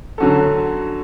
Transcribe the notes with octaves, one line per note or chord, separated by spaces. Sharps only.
D3 F#3 C#4 F#4 A4